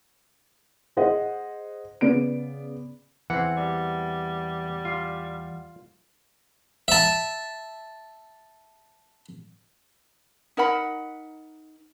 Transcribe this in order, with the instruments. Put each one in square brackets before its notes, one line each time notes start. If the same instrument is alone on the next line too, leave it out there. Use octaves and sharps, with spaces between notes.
[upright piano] G#4 C5 D#5 F#5
C#3 B3 D5 D7
[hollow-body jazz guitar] E2 [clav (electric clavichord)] E3 C4 [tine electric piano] F#5
[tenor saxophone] G3
[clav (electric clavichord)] F4
[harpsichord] E5 A5
[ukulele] D#4 A#4 F#5 B5